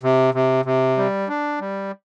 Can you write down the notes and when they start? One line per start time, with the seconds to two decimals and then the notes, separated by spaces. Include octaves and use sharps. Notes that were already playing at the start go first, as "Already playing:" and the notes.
0.03 C3
0.34 C3
0.65 C3
0.97 G3
1.28 D4
1.60 G3